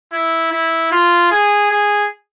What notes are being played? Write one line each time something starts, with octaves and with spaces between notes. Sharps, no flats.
E4
E4
F4
G#4
G#4